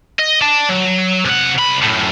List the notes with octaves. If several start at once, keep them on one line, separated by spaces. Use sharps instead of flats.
D#5
D5 A5
F#3
C3 F#5
C2 B5
F#2 A2